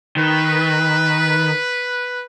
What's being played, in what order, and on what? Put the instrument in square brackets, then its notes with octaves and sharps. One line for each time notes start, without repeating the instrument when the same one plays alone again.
[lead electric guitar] D#3 [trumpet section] B4